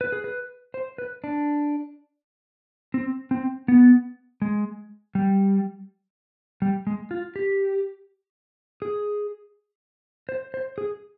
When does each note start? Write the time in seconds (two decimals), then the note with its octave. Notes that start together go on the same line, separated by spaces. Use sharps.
0.01 B4
0.12 G#4
0.24 B4
0.74 C5
0.98 B4
1.24 D4
2.94 C4
3.31 C4
3.68 B3
4.42 G#3
5.15 G3
6.62 G3
6.87 G#3
7.11 F4
7.36 G4
8.82 G#4
10.29 C5
10.54 C5
10.78 G#4